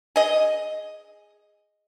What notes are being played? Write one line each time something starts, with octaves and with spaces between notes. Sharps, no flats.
G#4 D#5